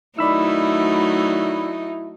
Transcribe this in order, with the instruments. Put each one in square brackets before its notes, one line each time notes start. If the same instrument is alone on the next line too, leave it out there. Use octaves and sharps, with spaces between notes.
[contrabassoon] D#3 [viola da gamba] F#3 A3 D#4 [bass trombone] E4 [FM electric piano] D5 B5 E6